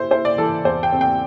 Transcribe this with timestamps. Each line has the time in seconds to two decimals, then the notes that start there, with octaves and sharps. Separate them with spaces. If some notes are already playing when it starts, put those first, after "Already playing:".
Already playing: E4 C5
0.11 E4 C5
0.25 D5
0.38 E3 A4
0.65 E2 C5
0.83 G5
0.92 C4
1.01 G5